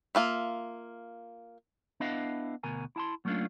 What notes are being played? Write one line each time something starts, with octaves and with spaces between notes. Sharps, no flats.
A#3 F4 E5
B3 D4 E4 B4 D#5 F5
D2 B2 A#4 G#5
E4 A5 C6
F#3 A3 A#3 C#4 D4 F4